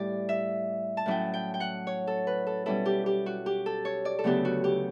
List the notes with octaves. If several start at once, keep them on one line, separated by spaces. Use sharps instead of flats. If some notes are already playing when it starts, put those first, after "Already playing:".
Already playing: A2 G3 E4 G4 D5
E5
A5
A2 F#3 C#4 E4 G5
G5
G5
F#5
C#5
A4
B4
A4
B2 G3 C#4 E4 A4
G4
G4
F#4
G4
A4
C#5
D5
A4
D2 C#3 F#3 B3 G4
F#4
G4